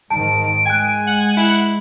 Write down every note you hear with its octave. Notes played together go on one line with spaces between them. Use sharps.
G#2 D#3 A5 D7
G#3 G5 G#5 F#6
F#5
E4